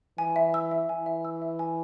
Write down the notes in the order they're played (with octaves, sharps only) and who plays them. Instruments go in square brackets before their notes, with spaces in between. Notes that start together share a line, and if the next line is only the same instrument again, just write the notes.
[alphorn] E3 [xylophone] G#5
[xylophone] E5
E6
E5
[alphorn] E3 [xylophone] G#5
[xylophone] E5
E6
E5
G#5